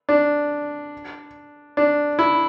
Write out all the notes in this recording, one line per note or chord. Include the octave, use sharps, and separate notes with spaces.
D4
D4
E4